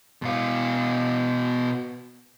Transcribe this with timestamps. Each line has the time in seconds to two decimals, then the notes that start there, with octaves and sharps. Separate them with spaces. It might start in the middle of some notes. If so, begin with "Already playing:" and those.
0.22 B2 F5